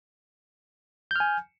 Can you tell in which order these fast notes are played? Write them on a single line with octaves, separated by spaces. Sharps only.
G6 F6 G#5